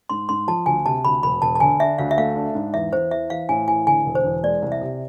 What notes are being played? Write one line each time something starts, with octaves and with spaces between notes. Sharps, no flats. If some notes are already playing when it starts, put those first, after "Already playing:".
G#2 C6
G#2 C6
F3 A5
D2 G#5
C3 A5
D2 B5
E1 B5
E1 A5
A5
D3 G#5
D4 E5
D2 F5
E5
A3 F5
D4
G#2
E2 E5
E2 C5
E3 E5
E3 F5
A2 G#5
E3 G#5
D3 G#5
E1
C5
E2
G#3 D5
C2
E5
C3